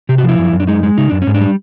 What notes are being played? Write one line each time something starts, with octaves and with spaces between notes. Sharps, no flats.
C3 G4
F#4
F3 E4
F#2
F#2
D4
G#3 D#4
G#3
C#3 D#4
F#2 D4
C#4
G#2
D4
G3